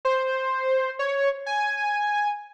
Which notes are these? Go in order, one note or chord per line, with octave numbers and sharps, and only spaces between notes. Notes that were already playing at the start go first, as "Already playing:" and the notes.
C5
C#5
G#5